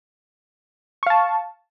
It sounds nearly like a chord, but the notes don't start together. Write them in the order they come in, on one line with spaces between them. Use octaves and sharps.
C#6 F5 A5